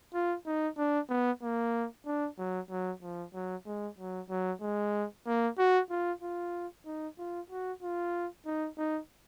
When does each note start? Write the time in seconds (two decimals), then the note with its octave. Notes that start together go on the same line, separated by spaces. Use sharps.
0.14 F4
0.46 D#4
0.78 D4
1.09 B3
1.42 A#3
2.06 D4
2.38 F#3
2.70 F#3
3.02 F3
3.34 F#3
3.66 G#3
3.98 F#3
4.30 F#3
4.61 G#3
5.27 A#3
5.58 F#4
5.90 F4
6.22 F4
6.86 D#4
7.18 F4
7.50 F#4
7.82 F4
8.46 D#4
8.78 D#4